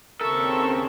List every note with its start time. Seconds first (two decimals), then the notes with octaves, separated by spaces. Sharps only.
0.21 D#2 C#3 C4 A4 A#4 E5 C#6